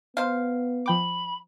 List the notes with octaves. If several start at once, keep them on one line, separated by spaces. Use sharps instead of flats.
B3 C5 F5
F3 G5 B5 D6